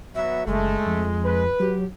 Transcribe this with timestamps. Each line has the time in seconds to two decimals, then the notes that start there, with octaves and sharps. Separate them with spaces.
0.15 F#3 B3 F#4 E5
0.47 F#1 G#3 A3
0.86 F2
1.25 B4
1.60 F#3 G4